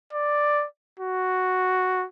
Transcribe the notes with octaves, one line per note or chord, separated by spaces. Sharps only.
D5
F#4